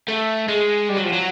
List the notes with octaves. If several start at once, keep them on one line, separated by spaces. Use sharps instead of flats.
A3
G#3
G3
F#3
F3
F#3